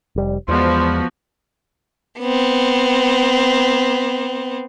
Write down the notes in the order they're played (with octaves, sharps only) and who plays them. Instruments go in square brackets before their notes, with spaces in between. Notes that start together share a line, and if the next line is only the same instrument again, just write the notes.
[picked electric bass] F1 G3
[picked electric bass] E2 G#3 [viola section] F3 B3 F#4 [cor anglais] C5
[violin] B3 C4